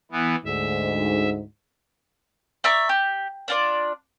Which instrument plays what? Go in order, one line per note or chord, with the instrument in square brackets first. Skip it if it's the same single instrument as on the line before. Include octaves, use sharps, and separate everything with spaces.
[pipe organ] E3 B3
[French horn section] D2 G#2 [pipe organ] E5
[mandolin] D5 E5 A#5 C#6
G4
D4 F4 D5